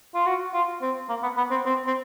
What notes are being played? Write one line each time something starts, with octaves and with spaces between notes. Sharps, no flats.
F4
F#4
F4
C4
A#3
B3
B3
C4
C4
C4